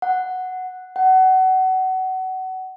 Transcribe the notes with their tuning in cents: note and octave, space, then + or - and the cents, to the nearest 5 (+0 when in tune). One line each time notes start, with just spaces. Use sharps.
F#5 +0
F#5 +25